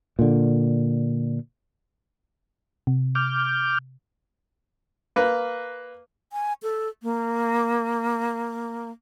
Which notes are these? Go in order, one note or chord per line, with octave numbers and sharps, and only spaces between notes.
A#2 D3
C3
D6 F6 G6
A#3 B4
G#5
A4
A#3